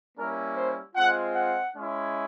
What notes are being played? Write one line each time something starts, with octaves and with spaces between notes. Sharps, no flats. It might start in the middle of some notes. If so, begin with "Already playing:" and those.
G3 A#3 C#4 E4 A#4
C5
G#3 C4 F4 F#5
F#5
G#3 C#4 E4